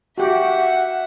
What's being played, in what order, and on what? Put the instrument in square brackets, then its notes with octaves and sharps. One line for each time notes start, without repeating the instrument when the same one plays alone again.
[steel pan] F#4 G4 [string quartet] E5 F#5